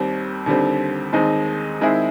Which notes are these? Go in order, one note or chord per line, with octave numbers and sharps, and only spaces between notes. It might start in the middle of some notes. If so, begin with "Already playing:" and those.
Already playing: D#2 D#3 G3 C4
D#2 D3 G3 C4
D#2 D#3 G#3 C4 D#4
D#3 G#3 C4 E4 G#4